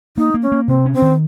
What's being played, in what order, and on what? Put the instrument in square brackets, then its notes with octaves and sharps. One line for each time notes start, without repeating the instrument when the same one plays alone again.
[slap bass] A#3 [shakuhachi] D#4
[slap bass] A#3
[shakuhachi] C#4
[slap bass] A#3
[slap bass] C3 [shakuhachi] C4
[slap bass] C#4
[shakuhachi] C4
[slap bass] D#3